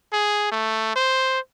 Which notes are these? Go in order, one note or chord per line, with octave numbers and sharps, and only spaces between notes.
G#4
A3
C5